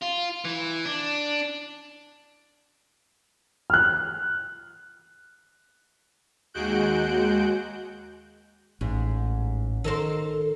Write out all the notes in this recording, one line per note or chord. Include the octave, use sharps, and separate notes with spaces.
F4
E3
D4
F6 F#6
D#2 G#3 F#4 F#6 G6 D7
A1 G#2
D#3 A4 A#4 C5